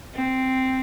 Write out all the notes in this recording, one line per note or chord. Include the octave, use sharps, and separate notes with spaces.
C4